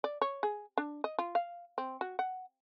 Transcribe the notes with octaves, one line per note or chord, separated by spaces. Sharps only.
D5
C#5
G#4
D4
D#5
F4
F5
C4
F#4
F#5